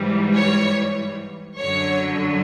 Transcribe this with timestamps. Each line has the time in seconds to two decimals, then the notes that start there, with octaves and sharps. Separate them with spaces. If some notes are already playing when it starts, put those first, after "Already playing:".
Already playing: G#2 E3 G3
0.35 C#5
1.59 F#2 D3 F#3 C#5